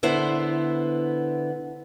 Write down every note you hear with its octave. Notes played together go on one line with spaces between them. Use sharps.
D3 B3 E4 C5